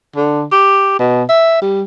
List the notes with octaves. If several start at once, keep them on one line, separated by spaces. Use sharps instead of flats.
D3
G4
B2
E5
G3